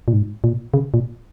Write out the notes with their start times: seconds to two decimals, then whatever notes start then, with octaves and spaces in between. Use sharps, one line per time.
0.08 A#2
0.13 G#2
0.44 A#2
0.74 C#3
0.94 A#2